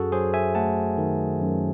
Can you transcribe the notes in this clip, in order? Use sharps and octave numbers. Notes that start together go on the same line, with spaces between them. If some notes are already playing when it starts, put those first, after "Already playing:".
Already playing: F#2 F#4 G#4 A4
F#3 G#4 C5
E5 G#5
A3 F#5 A5
D#3
F#2